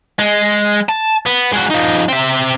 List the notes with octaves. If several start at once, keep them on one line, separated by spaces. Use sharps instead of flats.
G#3
A5
B3
G#3 F#4
F3 D#4
C4 E5